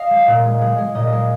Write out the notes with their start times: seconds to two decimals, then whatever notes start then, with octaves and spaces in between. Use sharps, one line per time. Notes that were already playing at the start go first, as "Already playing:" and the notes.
Already playing: D#5 F5
0.11 G#3
0.27 A#2
0.45 G#3
0.61 G#3
0.78 G#3
0.95 A#2 D#5
1.12 G#3